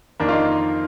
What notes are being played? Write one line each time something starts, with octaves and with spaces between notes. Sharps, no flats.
F2 D#3 A#3 D4
F4
D#4